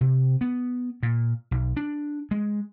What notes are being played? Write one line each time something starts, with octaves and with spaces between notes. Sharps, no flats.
C3
B3
A#2
B1
D4
G#3